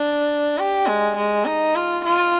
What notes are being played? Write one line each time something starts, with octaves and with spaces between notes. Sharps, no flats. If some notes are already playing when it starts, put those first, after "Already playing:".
Already playing: D4
G4
G#3
G#3
D#4
F4
F4